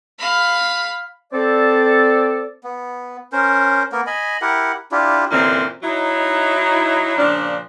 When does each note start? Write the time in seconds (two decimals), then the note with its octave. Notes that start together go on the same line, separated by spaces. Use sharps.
0.19 F5 B5
1.33 C4 A4 D5
2.64 B3
3.32 C#4 A#4 C5
3.92 A#3 B3 A#4
4.07 D#5 G#5 B5
4.42 E4 G4 A#4 F#5
4.92 D4 E4 F4 G4
5.31 F#2 A#2 D3 E3 C4 D4
5.83 F#3 D#4 E4
7.17 A#2 C#3 F3 D4